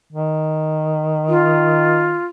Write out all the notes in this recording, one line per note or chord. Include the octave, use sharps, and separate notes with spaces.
D#3
F4